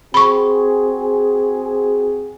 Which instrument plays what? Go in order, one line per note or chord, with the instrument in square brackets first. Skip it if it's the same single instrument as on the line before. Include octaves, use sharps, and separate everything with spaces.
[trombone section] C4 F#4 G#4 [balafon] B5 C#6